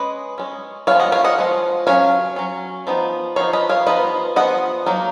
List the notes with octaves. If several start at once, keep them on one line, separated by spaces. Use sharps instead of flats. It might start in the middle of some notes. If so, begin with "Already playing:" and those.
Already playing: G#3 C#4 B4 D#5
G#3 C#4
F3 G#3 B3 C#5 F5
D#5 F#5
C#5 F5
D#5 F#5
F3 G#3
F#3 C#4 C#5 F5
F#3 C#4
F3 B3 D#4
F3 B3 D#4 C#5 F5
B4 D#5
C#5 F5
F3 B3 D#4 B4 D#5
F3 B3 D#4 D#5 F#5
F#3 A#3 D#4